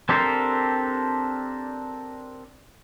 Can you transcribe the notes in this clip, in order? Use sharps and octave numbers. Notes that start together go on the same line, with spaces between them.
C4 D4 G4 A4 A#4 C5